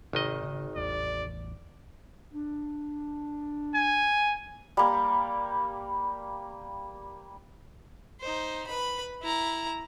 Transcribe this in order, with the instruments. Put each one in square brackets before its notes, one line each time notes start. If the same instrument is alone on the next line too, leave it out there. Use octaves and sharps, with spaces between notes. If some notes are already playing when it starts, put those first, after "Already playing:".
[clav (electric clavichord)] G#1 D#3 D#5 [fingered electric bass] C3
[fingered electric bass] C#3
[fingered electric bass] A1 E2 [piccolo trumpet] D5
[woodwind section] D4
[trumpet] G#5
[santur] G3 A#3
[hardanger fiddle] D#4 C5
B4 B5
E4 A#5